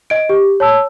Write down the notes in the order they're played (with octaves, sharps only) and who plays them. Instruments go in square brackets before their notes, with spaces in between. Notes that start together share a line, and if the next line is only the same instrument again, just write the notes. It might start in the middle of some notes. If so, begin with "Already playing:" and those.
[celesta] D#5 D7
G4
C#5 A5 E6